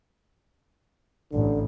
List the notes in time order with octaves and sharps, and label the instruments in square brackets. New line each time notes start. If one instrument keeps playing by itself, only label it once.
[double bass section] A1 [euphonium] D3